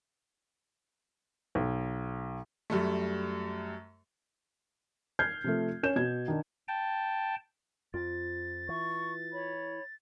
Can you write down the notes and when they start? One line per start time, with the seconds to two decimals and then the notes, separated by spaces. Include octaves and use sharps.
1.55 B1
2.70 F#2 G3 A3
5.19 F6 G6 G#6 C7
5.44 C3 F3 A3
5.83 C#4 C#5 G6 E7
5.96 B2 G#6
6.28 D#3 D4
6.68 G5 A5
7.94 F2 F4 A6
8.69 E3 C#6
9.32 C#5 B5